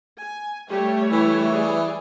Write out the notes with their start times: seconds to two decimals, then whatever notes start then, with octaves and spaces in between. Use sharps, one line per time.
0.20 G#5
0.69 G3 A3 G4 C#5
1.12 E3 E4
1.52 G#4 D5